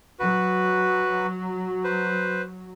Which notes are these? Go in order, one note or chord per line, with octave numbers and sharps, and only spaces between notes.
F#3 F#4 B4
B4 C5